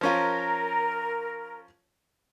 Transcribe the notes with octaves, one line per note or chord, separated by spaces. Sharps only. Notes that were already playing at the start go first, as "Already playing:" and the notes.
F3 C#4 F4 A#4